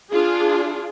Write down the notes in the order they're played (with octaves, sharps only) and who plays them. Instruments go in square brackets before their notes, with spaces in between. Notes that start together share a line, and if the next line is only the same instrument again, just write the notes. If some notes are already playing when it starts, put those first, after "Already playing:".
[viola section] D4 F4 G#4